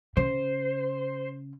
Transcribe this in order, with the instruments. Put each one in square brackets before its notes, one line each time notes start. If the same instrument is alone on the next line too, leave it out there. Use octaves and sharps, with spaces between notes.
[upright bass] C#3 [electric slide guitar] C5